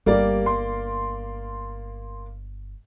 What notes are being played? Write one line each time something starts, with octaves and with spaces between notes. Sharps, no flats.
G1 G3 A#3 G4 A#4 D5
C6